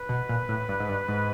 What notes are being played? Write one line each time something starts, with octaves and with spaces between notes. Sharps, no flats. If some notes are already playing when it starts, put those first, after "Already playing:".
Already playing: B4
B2
A#2
A2
G2
G#2
G2
G#2